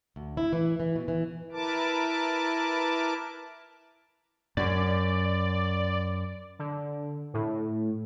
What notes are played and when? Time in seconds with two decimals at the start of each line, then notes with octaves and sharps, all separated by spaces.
0.16 D2
0.37 E4
0.53 E3
0.80 E3
0.96 B2
1.08 E3
1.52 E4 A#4 B4 A5 D6
4.57 F#2 D5
6.59 D3
7.34 A2